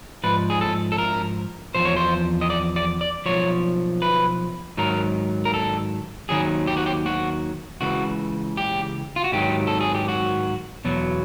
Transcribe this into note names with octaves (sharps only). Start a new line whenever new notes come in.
G#2 F3 B4
G#4
A4
A4
A#4
E2 C3 F3 C5
C#5
C5
D#5
D5
D5
D5
B1 A#2 F3 C#5
B4
G#2 D#3 F#3 A#4
A#4
A4
D#2 D#3 F#3 G#4
G4
F#4
G4
F#4
C#2 C#3 E3 F#4
G4
F4
F#4
G#2 D#3 F#3 G4
A4
G#4
G4
F#4
E2 B2 F#3